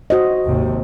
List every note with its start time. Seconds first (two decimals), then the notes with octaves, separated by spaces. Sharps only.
0.10 F#4 C5 D#5
0.44 G#1 D#2 C3